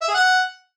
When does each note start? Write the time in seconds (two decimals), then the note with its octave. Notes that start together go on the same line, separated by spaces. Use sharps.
0.02 E5
0.08 G#4
0.14 F#5